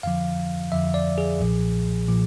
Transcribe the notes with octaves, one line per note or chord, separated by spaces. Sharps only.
F2 D3 F3 F5
F2 D3 F3 E5
D5
G#4
B1 A#2 F3
A#2 F3